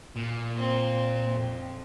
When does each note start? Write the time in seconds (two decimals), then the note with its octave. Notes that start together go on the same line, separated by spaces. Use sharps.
0.16 A#2
0.54 A#3 C4
1.29 F2